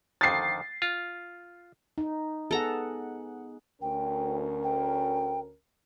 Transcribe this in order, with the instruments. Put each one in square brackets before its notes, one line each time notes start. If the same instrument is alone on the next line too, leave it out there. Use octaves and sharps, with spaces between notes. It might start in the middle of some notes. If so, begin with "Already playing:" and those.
[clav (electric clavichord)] F2 D3 D#3 [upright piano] A6 C7
[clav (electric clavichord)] F4
[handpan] D#4
[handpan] B3 G#4 F#5 [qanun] A4 A#5
[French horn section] D2 C#4 A#4 [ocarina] G5
[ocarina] G5